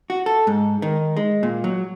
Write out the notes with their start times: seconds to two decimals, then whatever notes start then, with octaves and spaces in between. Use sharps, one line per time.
0.10 F#4
0.26 A4
0.47 G#2
0.82 D#3
1.17 G#3
1.43 A#2
1.64 F#3